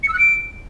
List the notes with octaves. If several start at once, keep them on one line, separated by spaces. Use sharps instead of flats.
C#7
E6
F#6
D7